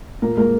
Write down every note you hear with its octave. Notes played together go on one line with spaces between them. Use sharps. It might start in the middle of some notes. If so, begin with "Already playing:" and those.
A#2 A#3 A#4
G#3 A#3 A#4